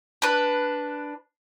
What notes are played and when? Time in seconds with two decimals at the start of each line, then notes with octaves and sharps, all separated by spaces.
0.22 D4 B4